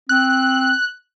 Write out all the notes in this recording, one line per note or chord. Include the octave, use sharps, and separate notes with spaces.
C4 F#6